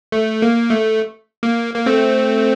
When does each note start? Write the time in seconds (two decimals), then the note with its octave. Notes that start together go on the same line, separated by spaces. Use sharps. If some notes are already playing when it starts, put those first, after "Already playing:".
0.12 A3
0.42 A#3
0.70 A3
1.43 A#3
1.74 A#3
1.86 A3 C4